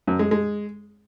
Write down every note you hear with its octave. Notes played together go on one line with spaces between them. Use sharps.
F#2
G#3
G#3